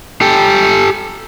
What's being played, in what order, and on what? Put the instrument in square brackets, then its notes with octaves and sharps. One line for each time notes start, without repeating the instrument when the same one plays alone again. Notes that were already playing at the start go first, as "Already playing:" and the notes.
[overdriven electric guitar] G4 A4